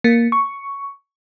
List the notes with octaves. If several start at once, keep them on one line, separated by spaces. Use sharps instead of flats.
A#3
C#6